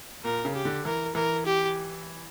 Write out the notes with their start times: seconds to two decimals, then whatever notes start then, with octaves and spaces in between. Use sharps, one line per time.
0.24 A#2 A#4
0.45 C#3
0.54 G4
0.65 D3
0.85 E3 A#4
1.15 E3 A#4
1.46 G4